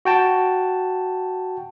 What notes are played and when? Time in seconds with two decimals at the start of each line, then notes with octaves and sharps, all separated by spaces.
0.05 F#4 G5 A5